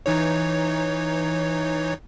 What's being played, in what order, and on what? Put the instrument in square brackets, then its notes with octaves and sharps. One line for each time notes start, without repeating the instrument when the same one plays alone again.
[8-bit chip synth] E3 D#4 C#5